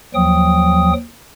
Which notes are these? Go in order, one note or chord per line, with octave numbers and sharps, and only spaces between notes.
D#2 F3 F#3 G5 D#6